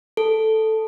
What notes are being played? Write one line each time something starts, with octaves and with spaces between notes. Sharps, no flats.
A4